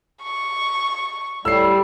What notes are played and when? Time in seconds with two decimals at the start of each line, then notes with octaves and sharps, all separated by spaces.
0.22 C#6
1.45 A2 G3 E6 C7